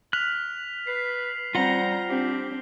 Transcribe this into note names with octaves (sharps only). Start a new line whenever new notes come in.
F6 F#6 B6 F7
B4 C7
G3 C4 F4 F#5 A#5 C7 G7
C4 D4 G4